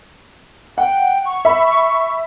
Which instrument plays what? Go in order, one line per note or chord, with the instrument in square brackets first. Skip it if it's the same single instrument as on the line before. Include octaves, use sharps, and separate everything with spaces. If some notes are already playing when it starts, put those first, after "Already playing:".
[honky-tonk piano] F#5 [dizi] G5
[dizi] C#6
[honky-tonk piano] E5 B5